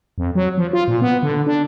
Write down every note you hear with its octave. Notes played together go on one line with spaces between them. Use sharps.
F2
F#3
F3
F4
A#2
B3
D3
D4